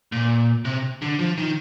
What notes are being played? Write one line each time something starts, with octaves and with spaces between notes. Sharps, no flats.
A#2
C3
D3
F3
D#3